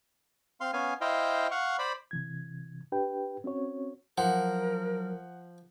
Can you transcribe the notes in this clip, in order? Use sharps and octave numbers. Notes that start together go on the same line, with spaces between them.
C4 F5 C6
B3 C#4 F5 G#5
E4 C5 D#5 F5 G5
F5 F#5 C#6
C5 D5 B5
C3 E3 G#6
D4 G4 B4 G5
C4 C#4 F#4 C#5
F3 F#3 A#4 F#5